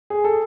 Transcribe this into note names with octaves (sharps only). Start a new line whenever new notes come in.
G#4
A4